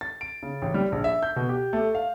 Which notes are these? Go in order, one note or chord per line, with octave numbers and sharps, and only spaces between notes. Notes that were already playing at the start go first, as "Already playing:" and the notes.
A6
D7
C#3
A1
G3
A#1
E5
G6
B2
G4
A3
F5